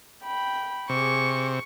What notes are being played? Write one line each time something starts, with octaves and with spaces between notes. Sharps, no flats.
G5 B5
C3 G#4 C#6 D6